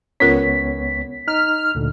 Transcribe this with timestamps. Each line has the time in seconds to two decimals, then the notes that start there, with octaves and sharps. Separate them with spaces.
0.20 C#2 B3 C#4 F4 A#4 C#5 B6
1.28 D#4 F6
1.75 D2 A#2 D3